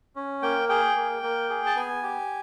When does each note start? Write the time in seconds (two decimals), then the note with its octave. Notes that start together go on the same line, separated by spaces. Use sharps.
0.16 C#4
0.42 A#3 G5
0.69 G#4 G5
0.96 A#3
1.23 A#3
1.50 G#4
1.66 A5
1.76 B3 G#5
2.03 G4